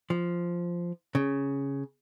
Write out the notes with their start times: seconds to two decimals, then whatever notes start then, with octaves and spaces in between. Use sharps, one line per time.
0.10 F3
1.15 C#3